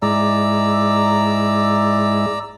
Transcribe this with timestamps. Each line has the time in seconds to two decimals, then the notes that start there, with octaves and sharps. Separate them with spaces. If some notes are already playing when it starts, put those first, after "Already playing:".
0.02 G#2 G#3 E4 D5 A#5 E6